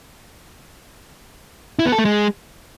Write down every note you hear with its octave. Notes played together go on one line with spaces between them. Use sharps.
E4
B3
A4
A3
G#3